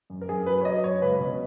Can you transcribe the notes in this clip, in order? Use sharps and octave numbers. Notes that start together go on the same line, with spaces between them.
F#2
A#4
F#2 G#4
F#3 B4
C#5
F#3 D#5
F#2 C#5
C#2 B4
B2